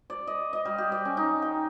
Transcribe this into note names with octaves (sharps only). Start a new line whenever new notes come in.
D5
D#5
D#5
G3
G4
D5
C#4
D#4
G5